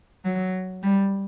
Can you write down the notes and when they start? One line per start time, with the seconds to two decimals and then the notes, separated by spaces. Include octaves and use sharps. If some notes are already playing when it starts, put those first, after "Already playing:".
0.25 F#3
0.83 G3